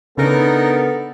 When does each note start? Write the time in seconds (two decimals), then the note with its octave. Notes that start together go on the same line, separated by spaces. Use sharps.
0.18 C#3 B3 D4 D#4 A4 A#4